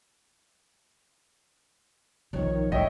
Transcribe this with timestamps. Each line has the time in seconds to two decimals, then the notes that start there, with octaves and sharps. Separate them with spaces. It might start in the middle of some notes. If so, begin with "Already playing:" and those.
2.33 B1 D#3 F3 C#5
2.72 A2 F#3 C#5 D#5 E5 G5